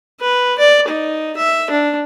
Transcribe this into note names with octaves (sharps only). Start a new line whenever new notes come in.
B4
D5
D#4
E5
D4